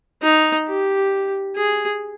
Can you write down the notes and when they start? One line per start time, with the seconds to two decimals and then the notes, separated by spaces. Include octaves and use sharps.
0.23 D#4
0.68 G4
1.56 G#4